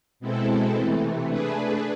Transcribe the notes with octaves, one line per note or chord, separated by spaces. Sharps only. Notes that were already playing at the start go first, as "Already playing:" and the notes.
B2 G#3 C4 E4 A4
C3 E3 A3
A3 D4 G#4 B4